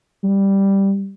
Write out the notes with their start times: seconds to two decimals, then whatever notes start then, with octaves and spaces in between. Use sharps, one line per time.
0.24 G3